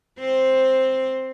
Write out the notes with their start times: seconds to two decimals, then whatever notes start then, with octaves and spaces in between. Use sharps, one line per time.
0.20 C4 C5